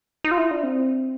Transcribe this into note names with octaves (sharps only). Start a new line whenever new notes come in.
D#4
F4
E4
D4
C4